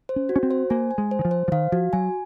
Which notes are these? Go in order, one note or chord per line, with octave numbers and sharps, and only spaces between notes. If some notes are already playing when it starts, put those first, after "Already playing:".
C5
C#4
F#4
C#4
C4
C5
A#3 G#5
G#5
G#3
C5
D#3
F3
C5
F3
D#3 F5
F3 F#4
F#3 G#5